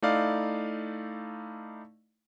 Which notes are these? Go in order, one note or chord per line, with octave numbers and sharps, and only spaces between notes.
A3 D#4 E4 D5 F5